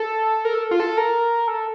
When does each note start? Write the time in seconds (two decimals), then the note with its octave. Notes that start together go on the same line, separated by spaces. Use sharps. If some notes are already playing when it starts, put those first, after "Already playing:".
Already playing: A4
0.45 A#4
0.54 A4
0.71 F4
0.80 A4
0.97 A#4
1.48 A4